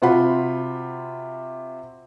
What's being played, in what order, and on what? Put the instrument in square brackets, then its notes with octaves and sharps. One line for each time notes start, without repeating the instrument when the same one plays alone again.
[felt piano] C3 C4 F4 F#4 F#5 B5